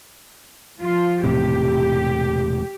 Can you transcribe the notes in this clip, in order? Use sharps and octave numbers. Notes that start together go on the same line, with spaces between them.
F3 F4
E1 A2 C3 G4